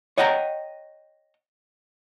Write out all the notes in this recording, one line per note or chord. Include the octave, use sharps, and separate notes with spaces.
C#5 D#5 F#5 G5 A5 A#5